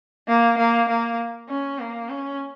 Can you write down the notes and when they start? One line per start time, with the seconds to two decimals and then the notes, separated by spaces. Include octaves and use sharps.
0.28 A#3
0.58 A#3
0.89 A#3
1.49 C#4
1.79 A#3
2.09 C#4